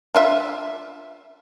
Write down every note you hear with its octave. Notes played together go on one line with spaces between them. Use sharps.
D4 F4 E5